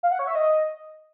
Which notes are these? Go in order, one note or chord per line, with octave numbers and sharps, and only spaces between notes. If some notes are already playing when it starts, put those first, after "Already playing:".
F5
F#5
C#5
E5
D#5